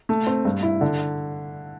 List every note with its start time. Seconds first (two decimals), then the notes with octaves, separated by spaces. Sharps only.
0.09 A3
0.27 C4
0.45 G2
0.63 E4
0.81 D3